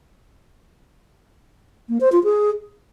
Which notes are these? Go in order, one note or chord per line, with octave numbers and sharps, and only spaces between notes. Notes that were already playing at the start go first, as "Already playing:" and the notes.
A#3
C5
F4
G#4